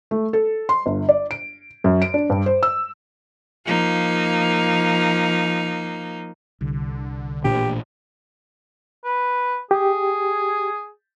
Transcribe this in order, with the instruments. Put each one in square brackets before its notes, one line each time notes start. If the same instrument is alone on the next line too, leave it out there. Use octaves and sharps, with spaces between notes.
[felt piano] A3
A4
C6
G1
D5
D7
F#2
D7
D4
G2
C5
E6
[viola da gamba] F3 A#3 D#4
[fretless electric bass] C2 [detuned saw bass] D3
[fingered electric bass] A1 A#2 D4 [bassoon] G4
[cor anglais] B4
[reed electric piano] G4 [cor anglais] G#4